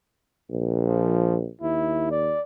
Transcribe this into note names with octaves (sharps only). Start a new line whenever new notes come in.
A#1
F3
D#2 E4
D5